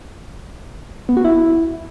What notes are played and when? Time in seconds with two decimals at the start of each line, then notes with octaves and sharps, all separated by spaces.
1.09 B3
1.17 F#4
1.25 E4